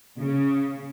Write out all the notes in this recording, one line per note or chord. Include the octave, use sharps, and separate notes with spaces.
C#3